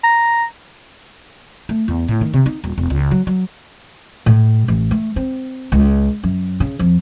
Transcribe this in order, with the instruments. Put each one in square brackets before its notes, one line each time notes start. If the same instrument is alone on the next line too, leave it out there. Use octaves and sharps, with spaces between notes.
[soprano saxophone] A#5
[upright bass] A3
E2
A2
D#3
C3
D#4
D#1
E1
C#2
F#3
F#3
A2
A1
A3
C4
C#2
F#2
C#3
F2